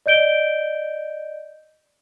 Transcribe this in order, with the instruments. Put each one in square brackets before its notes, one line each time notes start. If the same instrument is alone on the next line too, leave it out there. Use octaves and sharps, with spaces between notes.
[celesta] D5 D#5 G6 D7 G7